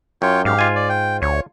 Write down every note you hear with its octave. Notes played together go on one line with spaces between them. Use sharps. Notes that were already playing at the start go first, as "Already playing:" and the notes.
F#2 F4 C#5 G5
G#2 G4 F5
F4 G#5
D5
G5
D2 C#5